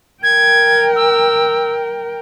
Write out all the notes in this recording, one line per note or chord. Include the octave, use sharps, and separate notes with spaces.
A#4 G5 G#6
E6